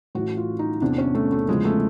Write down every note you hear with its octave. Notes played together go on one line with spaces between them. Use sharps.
A2 E3 F#4
F4
D#4
E2 C3 E3 D4
C#4
A3
A3
E2 C#3 F3 G#3
A3